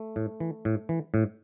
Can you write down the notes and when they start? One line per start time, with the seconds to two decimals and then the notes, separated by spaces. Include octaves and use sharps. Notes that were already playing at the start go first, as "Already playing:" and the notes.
Already playing: A3
0.16 A2
0.40 E3
0.65 A2
0.89 E3
1.14 A2